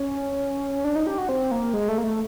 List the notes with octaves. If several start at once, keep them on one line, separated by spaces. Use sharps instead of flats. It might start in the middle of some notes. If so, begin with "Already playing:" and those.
Already playing: C#4
D4
D#4
G4
F#4
C4
A#3
G#3
A3
A#3
A3